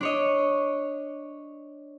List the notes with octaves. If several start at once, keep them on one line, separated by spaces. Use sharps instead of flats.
D4 C#5 D#5